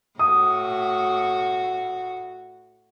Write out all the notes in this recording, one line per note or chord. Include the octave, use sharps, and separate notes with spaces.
A2 F#4 D#6